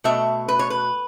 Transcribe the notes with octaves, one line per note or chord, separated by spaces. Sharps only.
B2 A3 E5
B4
C#5
B4